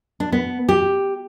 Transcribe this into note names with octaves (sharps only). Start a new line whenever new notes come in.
D4
B3
G4